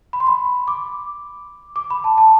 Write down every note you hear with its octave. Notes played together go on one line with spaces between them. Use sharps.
B5
C6
B5
D6
D6
B5
A5
A5